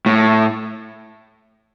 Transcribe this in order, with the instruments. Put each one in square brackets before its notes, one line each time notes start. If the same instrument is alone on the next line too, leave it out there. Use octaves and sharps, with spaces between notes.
[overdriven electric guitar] A2